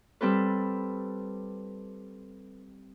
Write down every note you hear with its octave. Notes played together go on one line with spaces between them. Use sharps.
G3 C4 A4 B4